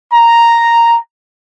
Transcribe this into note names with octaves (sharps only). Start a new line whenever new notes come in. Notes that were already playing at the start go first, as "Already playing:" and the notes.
A#5